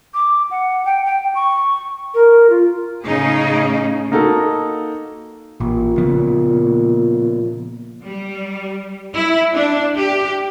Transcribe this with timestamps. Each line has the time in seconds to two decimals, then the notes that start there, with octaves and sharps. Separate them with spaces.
0.14 D6
0.51 F#5
0.85 G5
1.05 G5
1.35 C#6
2.14 A#4
2.50 F4
3.06 A2 C#3 C#4 D#4 G#4
4.12 A#3 D#4 F#4 A4
5.60 A1 A#2
5.97 C#3 F3 B3
8.05 G3
9.16 E4
9.53 D4
9.96 G4